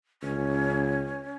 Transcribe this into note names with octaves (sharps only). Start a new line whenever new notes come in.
C#2 C#4